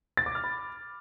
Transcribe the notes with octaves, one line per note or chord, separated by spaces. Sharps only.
A6
D6
F6
B5